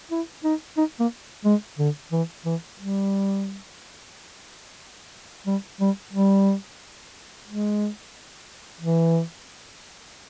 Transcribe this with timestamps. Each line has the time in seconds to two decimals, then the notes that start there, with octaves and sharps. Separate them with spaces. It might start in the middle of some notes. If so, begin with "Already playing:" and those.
0.11 E4
0.44 D#4
0.77 D#4
1.00 A#3
1.45 G#3
1.79 D3
2.12 E3
2.45 E3
2.78 G3
5.46 G3
5.80 G3
6.13 G3
7.48 G#3
8.81 E3